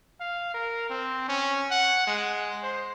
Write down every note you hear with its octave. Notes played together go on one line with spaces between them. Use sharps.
F5
A#4
C4
C#4
F#5
G#3
C5